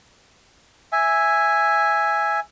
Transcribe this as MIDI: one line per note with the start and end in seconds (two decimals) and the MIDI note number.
0.93 2.40 76
0.93 2.40 80